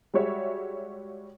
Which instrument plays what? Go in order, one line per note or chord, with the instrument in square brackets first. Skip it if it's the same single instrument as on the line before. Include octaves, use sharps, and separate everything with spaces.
[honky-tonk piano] G3 G#3 F#4 C#5 E5